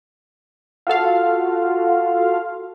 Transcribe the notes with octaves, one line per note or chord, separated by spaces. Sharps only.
F4 F#4 A4 F5